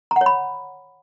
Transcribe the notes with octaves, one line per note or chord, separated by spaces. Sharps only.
A#5
F#5
C#5
B5